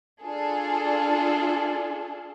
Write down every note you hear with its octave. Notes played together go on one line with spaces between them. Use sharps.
D4 F4 G#4 A4